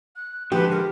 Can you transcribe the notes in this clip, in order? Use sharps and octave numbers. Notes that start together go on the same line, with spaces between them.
F#6
D3 F3 G#3 G4 B4
A#4